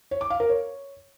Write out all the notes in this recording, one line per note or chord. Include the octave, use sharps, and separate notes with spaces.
C#5
D6
F5
A#4
C#5